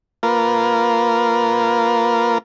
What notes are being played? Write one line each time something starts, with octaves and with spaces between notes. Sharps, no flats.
A#3 F4 A#4 B4